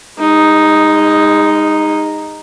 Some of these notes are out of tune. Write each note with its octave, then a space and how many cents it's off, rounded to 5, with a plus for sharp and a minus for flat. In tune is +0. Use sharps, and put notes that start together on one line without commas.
G#3 -35 D#4 +0